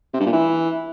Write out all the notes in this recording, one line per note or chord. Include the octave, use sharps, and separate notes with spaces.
C3
G2
A#2
E3